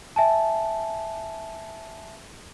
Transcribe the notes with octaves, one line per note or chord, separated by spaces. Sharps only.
E5 G#5 A5